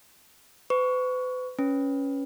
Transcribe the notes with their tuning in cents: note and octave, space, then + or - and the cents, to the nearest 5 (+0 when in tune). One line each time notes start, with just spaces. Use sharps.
B4 +45 C#6 +15
C#4 +0 B4 +0